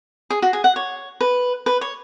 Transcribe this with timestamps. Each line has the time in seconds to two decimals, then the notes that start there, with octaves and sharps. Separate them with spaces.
0.30 G#4
0.42 F#4
0.53 G#4
0.64 F#5
0.76 C#5
1.21 B4
1.66 B4
1.81 C#5